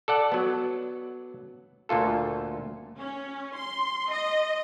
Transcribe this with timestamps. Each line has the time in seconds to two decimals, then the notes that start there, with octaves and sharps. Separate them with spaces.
0.08 A4 D5 F#5
0.32 F#3 B3
1.89 D2 A#2 F4 A4
2.98 C#4
3.56 C6
4.11 D#5